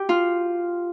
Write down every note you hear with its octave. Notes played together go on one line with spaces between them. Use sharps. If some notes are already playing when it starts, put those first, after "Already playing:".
Already playing: G4
F4